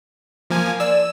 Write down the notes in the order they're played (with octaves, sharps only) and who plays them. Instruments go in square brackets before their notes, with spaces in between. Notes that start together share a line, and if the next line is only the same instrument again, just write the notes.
[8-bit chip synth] F3 A#3 G#5
[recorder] D5 [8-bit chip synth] E6